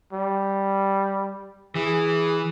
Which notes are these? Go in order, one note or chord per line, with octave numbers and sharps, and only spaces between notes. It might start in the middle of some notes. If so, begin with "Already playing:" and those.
G3
E3 G#4